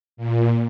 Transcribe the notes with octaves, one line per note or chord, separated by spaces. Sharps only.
A#2